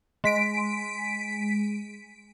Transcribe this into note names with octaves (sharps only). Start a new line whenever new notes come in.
G#3 B6 D7